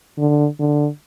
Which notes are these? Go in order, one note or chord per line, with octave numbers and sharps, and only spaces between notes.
D3
D3